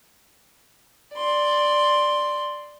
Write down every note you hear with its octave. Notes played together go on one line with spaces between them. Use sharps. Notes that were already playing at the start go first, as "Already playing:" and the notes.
D5 C6